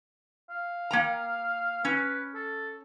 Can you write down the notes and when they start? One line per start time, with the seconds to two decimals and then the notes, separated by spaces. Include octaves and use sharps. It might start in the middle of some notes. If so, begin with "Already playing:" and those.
0.50 F5
0.91 A#3 G5 A#5
1.85 C#4 B4
2.35 A4